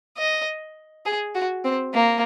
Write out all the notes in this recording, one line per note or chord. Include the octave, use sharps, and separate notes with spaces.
D#5
G#4
F#4
C4
A#3